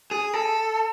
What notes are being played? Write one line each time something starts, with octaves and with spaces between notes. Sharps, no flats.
G#4
A4